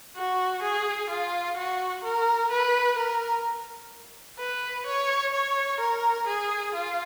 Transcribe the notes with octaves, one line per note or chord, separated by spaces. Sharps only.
F#4
G#4
F4
F#4
A#4
B4
A#4
B4
C#5
C#5
A#4
G#4
F4